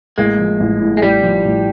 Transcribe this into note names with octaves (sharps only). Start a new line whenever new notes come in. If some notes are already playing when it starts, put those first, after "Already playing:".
A1 G#3 A#3
F3
A1
A2
G#3
A1 G3
F3
A1